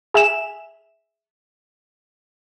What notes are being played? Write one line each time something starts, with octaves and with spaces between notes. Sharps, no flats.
G#4 E5 G#5 E7